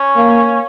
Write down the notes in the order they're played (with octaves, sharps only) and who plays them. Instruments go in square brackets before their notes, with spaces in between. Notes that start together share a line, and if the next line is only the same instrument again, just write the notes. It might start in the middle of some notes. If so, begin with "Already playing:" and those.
Already playing: [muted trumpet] C#4
[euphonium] A#3